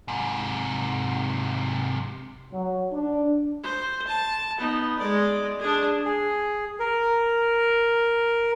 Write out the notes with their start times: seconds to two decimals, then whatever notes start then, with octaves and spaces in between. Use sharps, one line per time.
0.08 G#2 C3
2.53 F#3
2.92 D4
3.64 C5
4.08 A5
4.58 B3 D#4
4.99 G#3 D5
5.59 D4 G#4
6.05 G#4
6.80 A#4